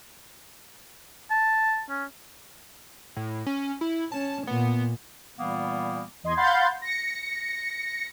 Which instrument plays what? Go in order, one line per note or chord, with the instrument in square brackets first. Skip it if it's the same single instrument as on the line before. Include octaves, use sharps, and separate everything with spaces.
[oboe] A5
C#4
[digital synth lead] A2
C#4
E4
[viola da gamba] C#4 [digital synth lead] A5
[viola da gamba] A#2 [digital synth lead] B3
[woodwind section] A#2 E3 G3 A#3 B3
[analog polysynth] E2 D#5 C6 G#6
F5 F#5 B5 C6 G6 A6
A#6 C#7